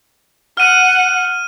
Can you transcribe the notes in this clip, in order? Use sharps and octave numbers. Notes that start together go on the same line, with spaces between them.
F#5 F6 D#7